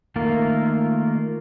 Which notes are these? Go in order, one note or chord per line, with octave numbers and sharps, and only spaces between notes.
D#3 A3 A#3 F4 A#4